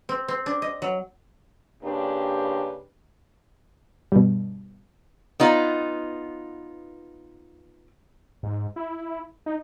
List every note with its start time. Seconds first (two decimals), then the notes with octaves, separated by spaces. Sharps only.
0.09 C4
0.28 C4
0.46 D4
0.62 D#5
0.82 F#3
1.83 C#3 A#3 C4 D4 G4 B4
4.12 G2 B2
5.40 B3 D#4 F4
8.43 G#2
8.76 E4
9.46 D#4